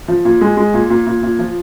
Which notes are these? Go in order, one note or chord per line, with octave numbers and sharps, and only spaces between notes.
F3
A#2
G#3
G#3
A#2
A#2
A#2
A#2
F3